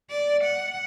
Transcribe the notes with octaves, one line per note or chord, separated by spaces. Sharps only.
D5
F#5